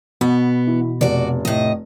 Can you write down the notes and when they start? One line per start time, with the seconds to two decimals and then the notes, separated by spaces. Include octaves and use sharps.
0.21 B2 B3
0.67 E3
1.01 F1 F#4 D5
1.45 A2 D#5